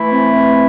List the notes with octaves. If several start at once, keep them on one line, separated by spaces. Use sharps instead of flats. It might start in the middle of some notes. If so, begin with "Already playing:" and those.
Already playing: E3 A3 E4
C4